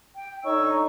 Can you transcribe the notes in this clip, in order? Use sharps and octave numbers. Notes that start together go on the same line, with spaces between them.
G5
D3 D#4 C#5 C#6 E6